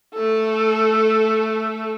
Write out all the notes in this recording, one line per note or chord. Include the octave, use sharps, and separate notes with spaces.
A3 A4